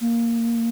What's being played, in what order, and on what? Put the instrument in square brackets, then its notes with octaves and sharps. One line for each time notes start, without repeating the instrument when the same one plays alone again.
[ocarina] A#3